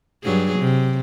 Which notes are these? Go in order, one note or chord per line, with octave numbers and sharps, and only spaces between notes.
G2 F#3 G#4
C3